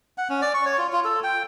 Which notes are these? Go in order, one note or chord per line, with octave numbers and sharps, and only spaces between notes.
F#5
C#4
D5
C#6
C#5
F4
F4
A4
G5